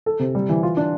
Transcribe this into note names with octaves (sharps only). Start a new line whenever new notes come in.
A4
C3
G3
E3
F4
D4